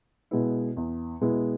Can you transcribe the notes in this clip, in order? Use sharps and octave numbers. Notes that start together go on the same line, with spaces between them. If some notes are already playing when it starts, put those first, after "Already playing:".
B2 G#3 B3 E4
E2
B2 G#3 B3 E4